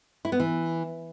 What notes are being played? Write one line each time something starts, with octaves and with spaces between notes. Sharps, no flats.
E4
B3
E3